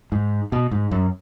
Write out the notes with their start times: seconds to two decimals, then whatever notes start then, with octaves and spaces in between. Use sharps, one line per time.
0.12 G#2
0.52 B2
0.71 G#2
0.91 F#2